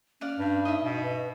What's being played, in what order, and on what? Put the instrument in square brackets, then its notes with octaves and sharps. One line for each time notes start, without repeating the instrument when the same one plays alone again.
[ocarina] C#4 [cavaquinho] D5 F5 F#5
[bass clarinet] G2
[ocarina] D#4 [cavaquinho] D#5 E5
[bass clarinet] B2
[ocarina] B4